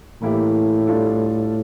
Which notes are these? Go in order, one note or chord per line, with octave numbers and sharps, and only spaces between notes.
A2 E3 A#3 E4 G4
G3 D4 F4 A4